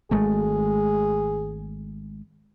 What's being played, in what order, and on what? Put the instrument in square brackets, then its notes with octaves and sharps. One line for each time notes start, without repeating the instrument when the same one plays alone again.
[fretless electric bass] G#1 G#3 A3 [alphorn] G#4